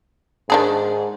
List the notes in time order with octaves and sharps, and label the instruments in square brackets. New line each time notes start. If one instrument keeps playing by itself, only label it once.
[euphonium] G#2 [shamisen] D#3 D4 G#4